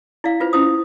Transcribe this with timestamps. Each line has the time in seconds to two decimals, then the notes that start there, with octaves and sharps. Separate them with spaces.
0.24 E4 D5 F5
0.40 F4 B4 C5
0.53 C#4 E4 C5 D#6